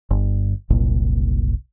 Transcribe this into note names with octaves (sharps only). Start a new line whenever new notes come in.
G1
F#1 C2 A#2